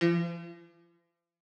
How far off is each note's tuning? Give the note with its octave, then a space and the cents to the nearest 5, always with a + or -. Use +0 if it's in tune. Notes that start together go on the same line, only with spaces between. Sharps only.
F3 -40